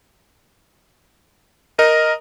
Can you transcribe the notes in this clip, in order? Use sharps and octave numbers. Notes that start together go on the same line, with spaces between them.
A#4 D#5